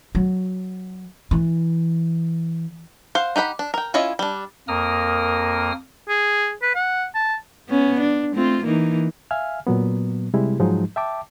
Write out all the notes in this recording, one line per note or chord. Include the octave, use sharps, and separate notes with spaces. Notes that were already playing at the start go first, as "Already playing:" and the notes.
F#3
E3
C5 F5 F#5
D#4 G4 F#5 B5
D4
A#4 G5
C#4 E4 F4 C#5 D#5
G3 D4
F2 A#3 A#4 D#6 F6
G#4
B4
F#5
A5
B3 C#4
D4
A3 C4 F4
E3 A#3 D#4
E5 F5 G#5 F6
A#2 F#3 B3
C3 G3 G#3 E4
G#2 F3 F#3 G#3 D#4
E5 G5 A5 D6